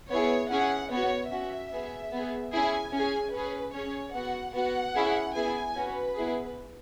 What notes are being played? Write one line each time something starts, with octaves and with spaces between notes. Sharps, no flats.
B3 E4 G#4 C#5
C#4 E4 G#4 F#5
B3 F#4 C#5
C#4 F#4 E5
B3 G#4
B3 G#4
C#4 E4 G#4 G#5
C#4 G#4 G#5
C#4 G#4 B4
C#4 G#4 C#5
B3 F#4 F#5
B3 F#4 F#5
C#4 E4 G#4
B3 E4 G#4 G#5
C#4 F#4 B4
B3 E4 G#4